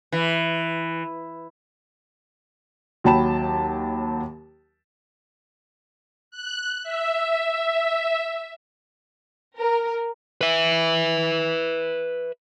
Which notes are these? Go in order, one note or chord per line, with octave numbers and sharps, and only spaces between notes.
E3
D#2 F#3 G5 A5 B5 E7
F#6
E5
A#4
B4 E5